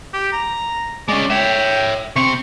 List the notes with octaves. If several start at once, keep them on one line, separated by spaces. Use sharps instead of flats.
G4
A#5
G#3 C#4 D5
C#5 E5 G5
C3 C4 C#6